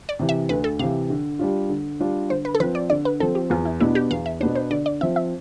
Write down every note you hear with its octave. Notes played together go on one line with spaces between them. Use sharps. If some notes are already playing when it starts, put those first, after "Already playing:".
D5
C3 E3
E5
D2 B4
A4
C3 E3 F5
D3
G3 D4 F4
D3
G3 D4 F4
D3 C5
B4
A4
F3 C4 B4
D5
D3 D5
B4
F3 C4 A4
G4
E2 F4
E4
B2 B3 D4 E4
G4
E2 F5
E5
B2 B3 D4 C5
C5
D3 D5
D5
F3 C4 E5
E5